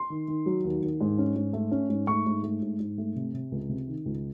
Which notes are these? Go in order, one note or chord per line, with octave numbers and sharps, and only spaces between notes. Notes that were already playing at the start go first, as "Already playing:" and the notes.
Already playing: C6
D#3
D#3
F#3
D#2
D#2
G#2
C#4
G#2
A3
C#4
G#2
A3 C#6
G#2
A3
G#2
G#2
A3
C3
C3
C#2
C3
D#3
C#2